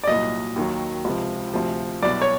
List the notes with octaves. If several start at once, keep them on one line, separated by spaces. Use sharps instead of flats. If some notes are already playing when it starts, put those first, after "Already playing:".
D5
C2 A#2 F#3 D#5
D#2 D#3 F#3
C#2 C3 F3
D2 C3 F3
C2 B2 F#3 D5
C#5